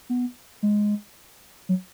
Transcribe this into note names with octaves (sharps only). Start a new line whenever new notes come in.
B3
G#3
F#3